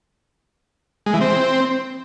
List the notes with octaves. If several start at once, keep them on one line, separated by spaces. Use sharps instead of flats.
G#3
E3
C4